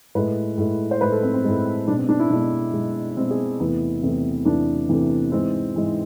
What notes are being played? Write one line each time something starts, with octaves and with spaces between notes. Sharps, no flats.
A2 G#3 B4
A2 G#3
C5
A2 G#3 B4
A4
C4
C4
A2 G#3
B2 G#3 D4
C4
D4
E4
B2 G#3 D4
B2 G#3
B2 G#3 C4
G#4
E2 C3 E3 A3 B3
E2 C3 E3 A3
E2 C3 E3 A3 D4
E2 C3 E3 A3
G#2 E3 G#3 C4
G#2 E3 G#3